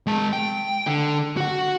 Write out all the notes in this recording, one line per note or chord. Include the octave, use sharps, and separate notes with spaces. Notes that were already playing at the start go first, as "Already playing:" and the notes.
G#3 A5
G5
D3
F#4 F#5